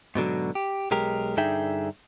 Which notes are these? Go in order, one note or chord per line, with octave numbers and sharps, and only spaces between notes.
G#2 B2 D3 F#3
G4
B1 G#3 G4 A#4
G2 D3 D#4 G#4 E5 G5